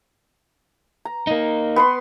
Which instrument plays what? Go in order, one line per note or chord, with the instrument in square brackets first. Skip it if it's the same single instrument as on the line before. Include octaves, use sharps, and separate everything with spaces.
[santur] A#5
[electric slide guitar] A#3 D#4
[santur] B3 B4 C6